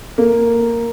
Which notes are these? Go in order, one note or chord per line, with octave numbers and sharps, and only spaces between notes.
A#3